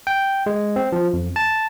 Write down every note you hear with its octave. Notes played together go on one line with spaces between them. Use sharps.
G5
G#3
C4
F3
F2
A5